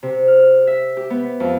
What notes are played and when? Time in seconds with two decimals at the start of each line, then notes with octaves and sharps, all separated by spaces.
0.03 C3
0.28 F6
0.67 E5
0.97 G4
1.10 B3
1.40 F2